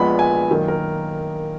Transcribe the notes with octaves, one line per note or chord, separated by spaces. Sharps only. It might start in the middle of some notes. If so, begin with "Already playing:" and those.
Already playing: A#1 A#2 G#3 B3 B5
G#5
F#2 D#3 A#3
A#4